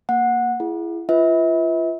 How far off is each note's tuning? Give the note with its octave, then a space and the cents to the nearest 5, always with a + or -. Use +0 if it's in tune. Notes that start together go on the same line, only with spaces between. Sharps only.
A#3 +0 F#5 -15
E4 +30 G#4 +10
F4 -30 B4 +0 E5 -40